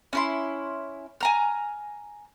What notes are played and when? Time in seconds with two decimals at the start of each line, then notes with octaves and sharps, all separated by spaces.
0.13 C#4 E4 C6
1.21 G#5 A#5 F6